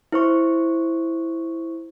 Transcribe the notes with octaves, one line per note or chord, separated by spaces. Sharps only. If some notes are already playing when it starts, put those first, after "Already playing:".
E4 C5 C#6